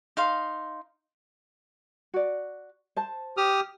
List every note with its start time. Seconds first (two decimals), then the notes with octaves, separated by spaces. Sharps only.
0.17 D#4 F5 C6
2.14 F#4 D5
2.96 C5 A5
3.37 G4 D#6 F6